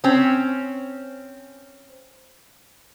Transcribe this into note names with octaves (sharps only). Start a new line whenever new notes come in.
C4 C#4